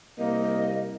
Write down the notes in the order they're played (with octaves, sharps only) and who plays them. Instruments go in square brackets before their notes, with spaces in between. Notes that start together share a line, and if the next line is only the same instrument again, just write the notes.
[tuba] C2 [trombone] A#3 [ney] D#5